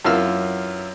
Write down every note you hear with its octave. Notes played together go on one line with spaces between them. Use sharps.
F#2 E3 F4 E5 E6 F6